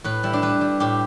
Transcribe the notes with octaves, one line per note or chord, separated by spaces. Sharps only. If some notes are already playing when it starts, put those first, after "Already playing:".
A2 B4
G3 E4
D4
G3 B4
G3
A2 G4